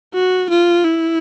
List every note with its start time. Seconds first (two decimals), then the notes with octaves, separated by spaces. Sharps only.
0.14 F#4
0.50 F4
0.84 E4